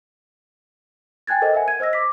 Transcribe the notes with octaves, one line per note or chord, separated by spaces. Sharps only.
G5 G#5 F#6 G#6 A6
A4 A#4 C5 D#5
A#4 E5 F#5 G#5
G#6 D#7
C5 D#5 E6 A#6
D6 B6